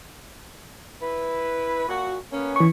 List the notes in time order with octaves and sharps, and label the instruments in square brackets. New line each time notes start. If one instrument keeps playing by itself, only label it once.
[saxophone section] E4 B4
A#2 F#4
A#3 B3 C#4
[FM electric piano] E3 C#6